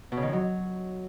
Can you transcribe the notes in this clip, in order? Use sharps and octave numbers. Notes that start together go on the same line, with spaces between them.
B2
C#3
D#3
F2
F#3